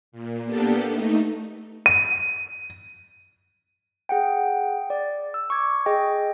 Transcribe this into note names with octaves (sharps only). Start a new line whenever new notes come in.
A#2
A#3 B3 D4 G4 A4
A3 D#4
D#7
G#4 F#5 G5
D5
E6
C#6 D6 G#6
G#4 D#5 G5